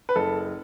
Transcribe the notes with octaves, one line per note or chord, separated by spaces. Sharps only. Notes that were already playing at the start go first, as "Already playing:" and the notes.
B4
F#1 A4